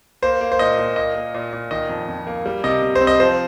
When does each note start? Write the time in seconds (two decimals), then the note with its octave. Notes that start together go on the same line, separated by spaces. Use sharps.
0.22 A#3 C5
0.41 A#3
0.52 C5
0.59 A#2 D#5
0.78 A#2
0.96 A#3 D#5
1.15 A#3
1.34 A#2
1.53 A#2
1.71 D#3 D#5
1.89 F2
2.08 F2
2.27 A#3
2.46 G3
2.64 C3 D#5
2.82 C3
2.95 C5
3.01 C4
3.07 D#5
3.20 F3 C5